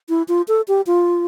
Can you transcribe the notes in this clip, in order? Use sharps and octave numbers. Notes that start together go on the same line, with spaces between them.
E4
F4
A4
G4
F4